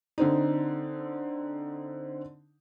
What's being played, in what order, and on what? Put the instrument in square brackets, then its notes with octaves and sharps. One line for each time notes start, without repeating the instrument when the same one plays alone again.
[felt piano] D3 C4 D#4